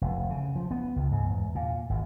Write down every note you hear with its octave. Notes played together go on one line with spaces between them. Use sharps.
F1
C#3
F3
B3
C#2
G#2
E2
A#2
G#1